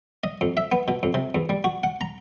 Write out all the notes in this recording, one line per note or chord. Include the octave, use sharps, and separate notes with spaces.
D#5
F2
E5
B3
B2
F2
C3
E2
G3
F#4
F#5
A#5